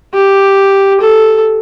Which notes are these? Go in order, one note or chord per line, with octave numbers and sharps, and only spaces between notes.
G4
A4